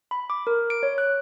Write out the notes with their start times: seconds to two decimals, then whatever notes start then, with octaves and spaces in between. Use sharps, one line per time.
0.11 B5
0.30 D6
0.47 A#4
0.70 D7
0.83 C#5
0.98 F#6